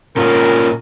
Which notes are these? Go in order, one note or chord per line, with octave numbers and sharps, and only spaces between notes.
A#2 C#4 F4 A#4